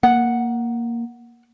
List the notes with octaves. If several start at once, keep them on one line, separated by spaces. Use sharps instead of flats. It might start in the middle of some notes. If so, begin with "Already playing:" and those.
A#3 F#5